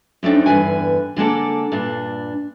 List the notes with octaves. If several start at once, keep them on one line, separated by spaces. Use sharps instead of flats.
F#2 A3 C4 D4 D#4
E2 G2 D3 B4 G#5
D3 G#3 A#3 A4 D5
G2 A#2 D4